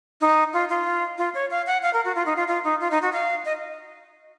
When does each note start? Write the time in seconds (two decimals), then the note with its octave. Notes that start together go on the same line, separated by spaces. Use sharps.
0.21 D#4
0.53 F4
0.69 F4
1.18 F4
1.35 C#5
1.50 F5
1.67 F#5
1.83 F5
1.93 A#4
2.05 F#4
2.15 F4
2.26 D#4
2.37 F4
2.48 F4
2.64 D#4
2.80 F4
2.91 D#4
3.02 F#4
3.13 F5
3.45 D#5